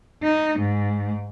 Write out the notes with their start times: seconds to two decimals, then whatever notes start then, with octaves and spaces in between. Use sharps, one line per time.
0.23 D#4
0.59 G#2